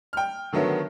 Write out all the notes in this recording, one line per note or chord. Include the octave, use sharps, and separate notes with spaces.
G5 F6
D3 D#3 F#3 A3 B3